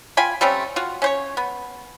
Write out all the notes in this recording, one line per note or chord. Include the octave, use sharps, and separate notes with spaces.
F4 G5 G#5 B5
G3 A3 C4 C#4
F4 F#4
C#4 C5 C#5
B3